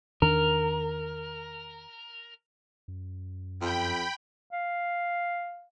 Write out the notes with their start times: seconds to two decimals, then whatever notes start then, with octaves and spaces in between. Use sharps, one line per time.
0.22 E2 D#3 D4 A#4
2.88 F#2
3.61 F2 G5 B5
4.52 F5